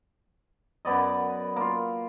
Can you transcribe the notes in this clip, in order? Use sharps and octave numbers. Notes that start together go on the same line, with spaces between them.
F#2 B3 D5 D#5
A#3 F4